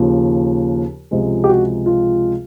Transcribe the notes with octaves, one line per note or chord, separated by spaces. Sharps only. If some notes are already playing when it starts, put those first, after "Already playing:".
Already playing: D#2 C#3 F3
C#2 C3 F3 G#3
G4
F#4
F4